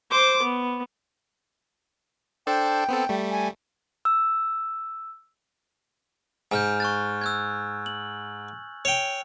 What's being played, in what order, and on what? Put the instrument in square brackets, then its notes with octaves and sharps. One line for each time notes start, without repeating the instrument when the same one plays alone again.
[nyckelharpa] C5 D6
B3
[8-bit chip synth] D4 A4 C5 [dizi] G5
[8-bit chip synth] B3 C4 A4
G3 A3
[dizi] G#5
[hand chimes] E6
[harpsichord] G#2 [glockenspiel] G#5 F6 G6
[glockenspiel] C#6 F#6 A6
E6 F#6 G#6
F#7
[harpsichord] C#5 G5